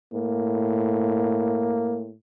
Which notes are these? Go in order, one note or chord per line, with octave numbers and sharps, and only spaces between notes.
A2 A#3